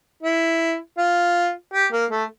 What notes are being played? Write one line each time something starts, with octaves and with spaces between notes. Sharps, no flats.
E4
F4
G4
A#3
A3